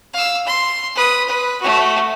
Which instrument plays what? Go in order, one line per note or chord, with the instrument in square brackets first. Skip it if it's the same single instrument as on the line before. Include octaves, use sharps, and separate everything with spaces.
[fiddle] F5 E6
C6
B4 D#6
B4
A3 F#4